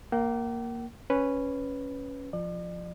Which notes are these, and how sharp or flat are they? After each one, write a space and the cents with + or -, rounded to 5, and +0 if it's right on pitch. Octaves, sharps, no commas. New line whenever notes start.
A#3 +0 G5 -45
C#4 +0 B4 +0
F3 +0 D5 +40